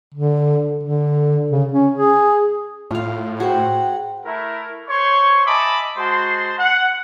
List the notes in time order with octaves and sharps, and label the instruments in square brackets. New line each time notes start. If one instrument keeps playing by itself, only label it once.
[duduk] D3
D3
C#3
C#4
G#4
[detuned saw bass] A2 [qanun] F4 F5
[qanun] F#4 C5 [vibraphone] G#4 G5 [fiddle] F#5
[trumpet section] A3 E4 A#4
C5 C#5 C6 C#6
D#5 E5 G#5 A5 B5 D6
G#3 F#4 C5 A5 C6
F#5